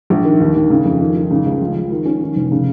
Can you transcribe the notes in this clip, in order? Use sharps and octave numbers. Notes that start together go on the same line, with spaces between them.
A#1
D#3
D#2
D#2
C#3
F2
D#3
D#3
C#3
C#2
F3
F3
D#3
C#4
D#3
F1
C#3